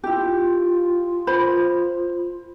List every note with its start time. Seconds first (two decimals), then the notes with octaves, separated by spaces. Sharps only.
0.04 E4 F4 G4
1.27 C5 B5